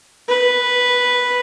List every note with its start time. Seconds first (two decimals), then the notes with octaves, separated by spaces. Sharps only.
0.28 B4